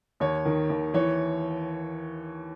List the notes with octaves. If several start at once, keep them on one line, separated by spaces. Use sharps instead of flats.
D#2 C#5
D#3
D#2
E3 C#5